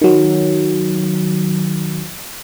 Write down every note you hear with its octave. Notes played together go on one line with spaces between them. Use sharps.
D#3 F#3